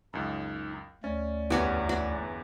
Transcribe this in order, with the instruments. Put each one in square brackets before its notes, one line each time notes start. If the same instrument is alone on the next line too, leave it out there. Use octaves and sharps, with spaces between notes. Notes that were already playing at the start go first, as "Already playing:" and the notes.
[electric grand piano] C#2 F#2 [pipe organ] D#4
[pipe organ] D2 A3 D5 [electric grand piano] C#4
[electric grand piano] G1 E2 E3 [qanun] C#4 F#4 G4
[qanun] F#4